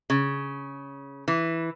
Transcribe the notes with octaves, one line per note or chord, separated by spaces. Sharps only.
C#3
E3